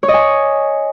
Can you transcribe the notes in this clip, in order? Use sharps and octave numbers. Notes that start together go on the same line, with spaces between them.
C#5
D#5
G#5